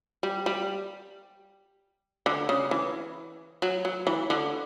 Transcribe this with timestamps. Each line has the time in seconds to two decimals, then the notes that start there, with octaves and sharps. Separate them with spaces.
0.23 G3
0.46 G3
2.26 D3
2.49 C#3
2.71 E3
3.62 F#3
3.85 F#3
4.07 E3
4.30 D3